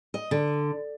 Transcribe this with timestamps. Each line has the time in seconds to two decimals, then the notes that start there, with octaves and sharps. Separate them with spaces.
0.14 D#5
0.31 D3